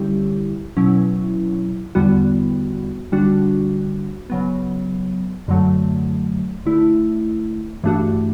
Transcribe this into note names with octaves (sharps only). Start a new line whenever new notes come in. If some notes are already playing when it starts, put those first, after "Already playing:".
Already playing: D3 G3 C#4 E4 G4
B2 F#3 C#4 E4
E2 D3 G3 B3 F#4
D3 G3 D4 F#4
C#3 F#3 B3
F#2 D3 F#3 A3
D3 A3 E4
G2 E3 A3 D4 F#4